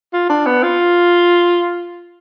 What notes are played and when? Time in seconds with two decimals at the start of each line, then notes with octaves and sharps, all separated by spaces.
0.13 F4
0.29 D4
0.46 B3
0.63 F4